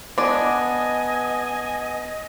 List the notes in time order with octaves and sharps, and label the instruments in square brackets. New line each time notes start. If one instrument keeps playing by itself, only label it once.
[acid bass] B3 [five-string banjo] D4 D5 [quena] D#5 [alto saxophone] G#5